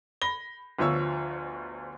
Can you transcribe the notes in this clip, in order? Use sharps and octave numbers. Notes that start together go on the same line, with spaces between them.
B5 A#6 G7
G1 D2 F3 C#5 E6